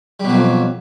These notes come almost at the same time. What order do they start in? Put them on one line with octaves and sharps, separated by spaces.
G3 B2 F#3 F2